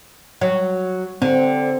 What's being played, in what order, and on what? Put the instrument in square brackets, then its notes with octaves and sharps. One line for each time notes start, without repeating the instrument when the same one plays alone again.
[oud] F#3
[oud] D3 [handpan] C4